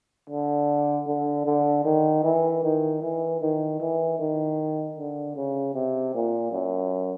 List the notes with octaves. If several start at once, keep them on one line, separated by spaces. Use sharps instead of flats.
D3
D3
D3
D#3
E3
D#3
E3
D#3
E3
D#3
D3
C#3
C3
A#2
F#2